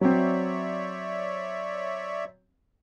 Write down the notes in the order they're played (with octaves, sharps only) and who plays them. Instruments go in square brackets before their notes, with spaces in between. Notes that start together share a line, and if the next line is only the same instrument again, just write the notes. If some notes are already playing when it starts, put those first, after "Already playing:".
[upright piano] F#3 C4 [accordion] C#5 D5 E5